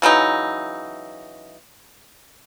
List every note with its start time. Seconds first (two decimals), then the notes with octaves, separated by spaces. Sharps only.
0.02 C#3 E3 F#3 D#4